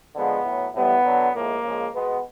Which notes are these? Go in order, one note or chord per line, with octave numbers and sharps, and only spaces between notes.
D3 F3 G#3 B3
A2 F#3
A2 E3 G3 B3
D3 F#3
A2 F3 G#3 A#3
C#3 F3 G#3
B2 G#3 B3